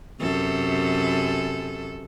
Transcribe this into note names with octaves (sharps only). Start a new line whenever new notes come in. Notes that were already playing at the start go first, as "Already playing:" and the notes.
F#2 C3 A4